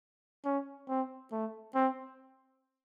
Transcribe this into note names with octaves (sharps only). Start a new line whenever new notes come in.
C#4
C4
A3
C4